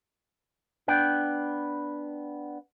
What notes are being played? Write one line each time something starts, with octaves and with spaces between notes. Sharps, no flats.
B3 D4 G5